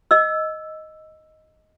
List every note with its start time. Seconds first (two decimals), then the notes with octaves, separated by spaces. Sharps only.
0.11 D#5 E6